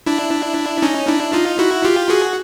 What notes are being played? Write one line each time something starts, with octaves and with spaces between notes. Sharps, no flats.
D4 E4
C#4 D#4
D4 E4
D#4 F4
E4 F#4
F4 G4
F#4 G#4